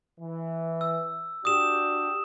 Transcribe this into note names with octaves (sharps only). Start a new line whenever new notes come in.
E3
E6
D4 F#4 G4 D#6 E7